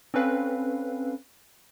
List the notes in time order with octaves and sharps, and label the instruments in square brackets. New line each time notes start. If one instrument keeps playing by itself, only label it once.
[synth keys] C4 C#4 A4 B4 F5